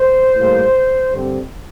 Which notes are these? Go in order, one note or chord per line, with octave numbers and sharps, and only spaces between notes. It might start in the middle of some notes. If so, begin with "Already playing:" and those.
Already playing: C5
A2 G3 A#3
G2 D3 G3 C4